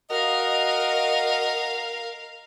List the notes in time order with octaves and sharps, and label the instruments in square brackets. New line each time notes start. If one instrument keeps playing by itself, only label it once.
[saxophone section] F#4 D#5 [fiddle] A#4 F5